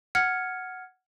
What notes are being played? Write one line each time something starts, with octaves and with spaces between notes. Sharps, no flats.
F#5 F6 G#6 C#7